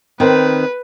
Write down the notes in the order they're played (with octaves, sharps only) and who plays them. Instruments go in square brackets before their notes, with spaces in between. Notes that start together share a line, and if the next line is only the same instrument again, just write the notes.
[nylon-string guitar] D#3 C4 [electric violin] B4